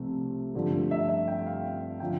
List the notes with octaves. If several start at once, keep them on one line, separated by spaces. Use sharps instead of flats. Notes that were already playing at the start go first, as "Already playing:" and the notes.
Already playing: C2 C3 F3 A3 C4
G2 D3 F3 A3
E5
E5
G5
F5
D3 F3 G5